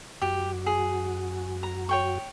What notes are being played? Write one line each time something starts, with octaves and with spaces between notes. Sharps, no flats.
F#2 F#4 G4
G#4
A#5
C#5 G5 C#6